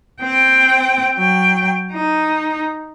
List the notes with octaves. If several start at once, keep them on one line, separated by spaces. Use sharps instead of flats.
C4 G5
F#3 G5
D#4